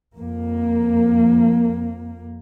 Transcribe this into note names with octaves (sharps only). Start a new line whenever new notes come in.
F2 A#3